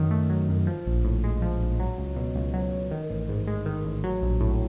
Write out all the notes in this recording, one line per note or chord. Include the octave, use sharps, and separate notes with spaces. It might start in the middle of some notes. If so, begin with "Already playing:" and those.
Already playing: F#2 D#3 F#3
A3
F#3
F#2
F3
A#1
A2
G#3
F3
A#1
F#3
C#2
B2
C#2
F#3
C#2
D#3
A1
G#2
G#3
D#3
A1
F#3
A#1
A2